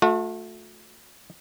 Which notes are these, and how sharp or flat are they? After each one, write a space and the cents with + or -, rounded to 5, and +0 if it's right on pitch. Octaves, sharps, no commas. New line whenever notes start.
A3 +0 F#4 -45